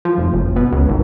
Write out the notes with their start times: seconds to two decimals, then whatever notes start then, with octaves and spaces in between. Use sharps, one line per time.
0.05 F3
0.18 F1
0.33 F#1
0.56 B2
0.73 C#2
0.89 G#1